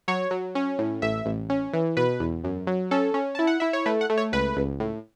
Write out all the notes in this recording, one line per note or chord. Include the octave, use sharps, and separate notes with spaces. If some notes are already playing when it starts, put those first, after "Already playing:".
F#3 C#5
F#3
C#4
A2
A1 E5
A1
C#4
E3
B2 B4
E2
F#2
F#3
C#4 A4
C#4
E4 A5
F#5
E4 E5
C#5
A3 B4
F#5
A3
C#5
C#2 B4
C#2
A2